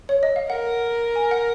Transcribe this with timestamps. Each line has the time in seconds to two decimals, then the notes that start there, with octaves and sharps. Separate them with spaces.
0.09 C#5
0.23 D#5
0.36 F5
0.50 A#4 F#5
1.16 G#5
1.31 F#5